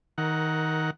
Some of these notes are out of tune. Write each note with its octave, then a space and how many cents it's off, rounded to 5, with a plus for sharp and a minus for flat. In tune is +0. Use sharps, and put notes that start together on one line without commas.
D#3 +20 A#4 +0 F#5 +0